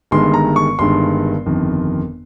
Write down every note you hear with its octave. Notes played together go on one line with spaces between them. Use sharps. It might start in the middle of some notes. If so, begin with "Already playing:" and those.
G1 G2 D#3 G#3 C6
A#5
C#6
G1 G2 D#3 G#3 C6
G1 F2 D#3